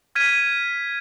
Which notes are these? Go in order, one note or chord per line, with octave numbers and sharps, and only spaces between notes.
F6 G#6 B6 D#7